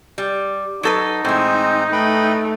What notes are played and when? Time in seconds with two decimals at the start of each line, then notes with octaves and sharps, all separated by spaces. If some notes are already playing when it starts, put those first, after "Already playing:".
0.18 G3
0.83 F#3 D#4 A4 B4
1.25 A2 E3 G#3 C4 C5
1.92 A3 B4 G5 B5